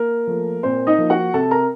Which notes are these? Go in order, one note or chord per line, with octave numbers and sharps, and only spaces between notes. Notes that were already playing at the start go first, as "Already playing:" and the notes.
Already playing: A#3 A#4
F3 A3
A#2 C4 C5
D#4 D#5
F3 A#3
F#4 F#5
C3 A4 A5
A#4 A#5